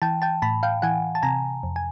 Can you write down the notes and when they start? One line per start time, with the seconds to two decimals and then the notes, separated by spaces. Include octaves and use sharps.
0.02 E3 G5 A5
0.22 G5 A5
0.42 A2 A5 B5
0.63 F5 G5
0.82 E3 F#5 G#5
1.15 A5
1.23 C3 G#5 A#5
1.63 F2
1.76 G#5